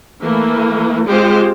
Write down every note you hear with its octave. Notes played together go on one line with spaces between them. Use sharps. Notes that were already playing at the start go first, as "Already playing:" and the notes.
E3 A3 A#3
G#3 C4 F4 G4 C5